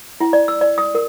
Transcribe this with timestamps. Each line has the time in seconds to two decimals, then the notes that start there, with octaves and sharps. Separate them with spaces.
0.20 E4
0.33 D5
0.48 E6
0.61 D5
0.78 D#6
0.95 A#4